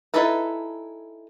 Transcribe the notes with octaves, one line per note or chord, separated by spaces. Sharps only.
D#4 E4 G#4 A4 B4